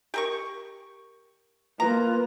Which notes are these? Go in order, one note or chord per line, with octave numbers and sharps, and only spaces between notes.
G4 A#4 C#6
A#3 F4 B4 A#5